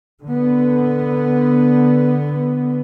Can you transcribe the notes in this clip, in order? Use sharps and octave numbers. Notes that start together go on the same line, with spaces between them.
D3 B3